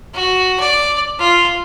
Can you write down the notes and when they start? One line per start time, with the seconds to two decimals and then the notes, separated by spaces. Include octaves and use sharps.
0.14 F#4
0.60 D5
1.19 F4